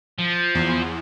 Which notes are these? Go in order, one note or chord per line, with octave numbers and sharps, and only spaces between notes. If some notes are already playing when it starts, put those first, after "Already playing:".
F3
E2